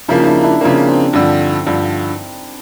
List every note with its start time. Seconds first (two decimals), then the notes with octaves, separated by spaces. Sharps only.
0.08 C#3 F3 A#3 D4 E4
0.20 D#4
0.26 D4 E4
0.44 D4 E4
0.61 C#3 F3 A#3 C4 D4
0.87 C4 D4
1.13 G2 D3 F3
1.66 G2 D3 F3